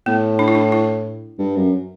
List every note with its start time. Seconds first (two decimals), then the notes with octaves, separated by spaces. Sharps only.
0.06 A2 B3
0.39 D4
0.48 E4
0.55 D4
0.72 E4
1.39 G2
1.56 F#2